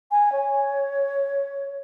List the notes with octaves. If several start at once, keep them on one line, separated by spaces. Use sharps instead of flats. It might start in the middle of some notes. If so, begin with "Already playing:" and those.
G#5
C#5